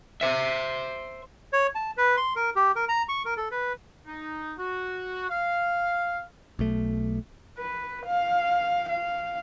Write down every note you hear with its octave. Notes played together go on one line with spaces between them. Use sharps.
C5 E5
C#5
A5
B4
C6
A#4
G4
A#4
A#5
C#6
A#4
A4
B4
D#4
F#4
F5
B1 A3
B4
F5
F5